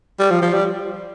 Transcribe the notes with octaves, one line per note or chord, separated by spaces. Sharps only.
G3
F3
F3
G3